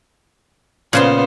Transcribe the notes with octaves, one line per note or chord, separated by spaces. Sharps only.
A#2 C#3 B3 C5 C6